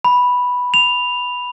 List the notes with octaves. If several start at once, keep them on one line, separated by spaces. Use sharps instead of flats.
B5
F7